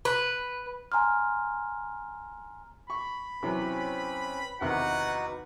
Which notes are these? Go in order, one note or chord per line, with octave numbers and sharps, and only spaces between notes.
B4
G#5 A#5 C6 F6
B5 C#6
C3 E3 F#3 C4 C#4 B4
E2 C3 D#3 D#4 F#4 B4 F#5